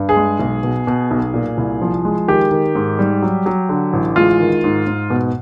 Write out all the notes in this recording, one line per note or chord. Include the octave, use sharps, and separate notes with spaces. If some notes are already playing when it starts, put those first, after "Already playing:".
Already playing: G2
G#4
G#3
B1
B2
B2
B1
A#2
C2
F3
G#3
D#3 G4
D#3
G#2
G3
F#3
F#3
D3
A1
G#3 F4
D#3
G#2
G#2
B2